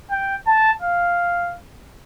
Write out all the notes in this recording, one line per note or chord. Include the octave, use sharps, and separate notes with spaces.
G5
A5
F5